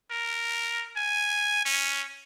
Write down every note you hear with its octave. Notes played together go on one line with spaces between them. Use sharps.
A#4
G#5
C#4